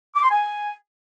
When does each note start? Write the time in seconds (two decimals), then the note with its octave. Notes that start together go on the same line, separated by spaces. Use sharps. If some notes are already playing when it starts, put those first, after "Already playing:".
0.15 D6
0.23 C6
0.31 G#5